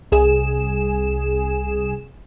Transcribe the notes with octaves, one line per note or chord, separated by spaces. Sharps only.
C2 G#4 E7